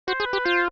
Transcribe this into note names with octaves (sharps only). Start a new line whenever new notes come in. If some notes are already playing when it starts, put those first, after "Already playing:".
F#4 C5
G#4
B4
G4
F4 C5